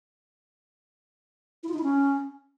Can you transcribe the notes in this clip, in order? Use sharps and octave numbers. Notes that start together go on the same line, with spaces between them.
E4
F4
D#4
E4
C#4